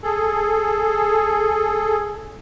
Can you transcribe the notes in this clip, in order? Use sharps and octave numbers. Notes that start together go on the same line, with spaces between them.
G#4 A4